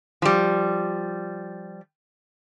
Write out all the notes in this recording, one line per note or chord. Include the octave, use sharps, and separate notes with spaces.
F3 G3